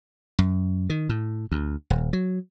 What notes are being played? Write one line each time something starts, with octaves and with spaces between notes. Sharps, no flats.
F#2
D#3
A2
D2
D#1
F#3